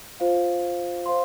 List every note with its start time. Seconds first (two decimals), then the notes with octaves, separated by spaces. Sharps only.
0.20 F4 C5 F5
1.06 C5 F5 C6